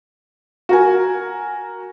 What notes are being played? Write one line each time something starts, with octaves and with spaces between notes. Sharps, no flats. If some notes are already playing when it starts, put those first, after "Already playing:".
F#4 A#4 G#5